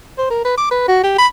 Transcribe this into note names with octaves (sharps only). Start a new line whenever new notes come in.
C5
A#4
B4
D6
B4
F#4
G4
B5